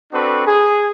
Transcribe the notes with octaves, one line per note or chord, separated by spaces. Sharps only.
C4 D4 F#4 A4 B4 C#6
G#4